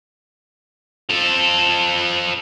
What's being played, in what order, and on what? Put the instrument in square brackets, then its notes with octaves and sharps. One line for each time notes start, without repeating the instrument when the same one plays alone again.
[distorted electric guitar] F3 A4